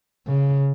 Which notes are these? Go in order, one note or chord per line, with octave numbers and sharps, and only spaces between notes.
C#3